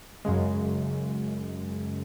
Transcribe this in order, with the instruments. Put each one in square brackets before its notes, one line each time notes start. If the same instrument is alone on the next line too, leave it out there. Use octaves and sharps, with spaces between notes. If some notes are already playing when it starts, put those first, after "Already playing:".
[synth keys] F#2 C#3 G#3